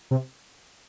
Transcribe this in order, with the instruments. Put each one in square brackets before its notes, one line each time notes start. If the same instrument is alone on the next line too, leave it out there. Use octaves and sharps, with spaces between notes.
[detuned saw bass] C3